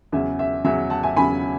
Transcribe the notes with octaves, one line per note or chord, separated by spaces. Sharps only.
E2 C#3 F#3 C#4 E5 G#5
E5
E2 C#3 F#3 C#4 E5
F#5 A5
E5 G#5
E2 C#3 F#3 C#4 G#5 B5